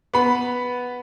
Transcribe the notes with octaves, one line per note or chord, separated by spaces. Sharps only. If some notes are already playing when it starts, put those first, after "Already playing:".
B3 B5